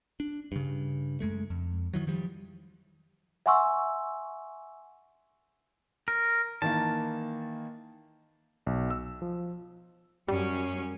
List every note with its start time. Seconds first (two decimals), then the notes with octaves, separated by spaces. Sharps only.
0.20 D4
0.52 G2 C#3
1.20 F#2 G#3 A3
1.50 F2
1.93 D#3 E3 F#3
2.07 D#3 F3 G3
3.46 E5 F#5 G#5 C6 C#6 E6
6.08 A#4
6.62 D#3 E3 A#3 A5
8.66 B1
8.91 E6
9.22 F3
10.28 F#2 G3 C#4